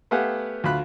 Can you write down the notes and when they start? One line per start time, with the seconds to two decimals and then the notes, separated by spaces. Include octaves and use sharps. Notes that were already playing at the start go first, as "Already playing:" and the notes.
0.11 A3 B3 G4 F5 F#5 G#5
0.64 D2 F4 B5 F#6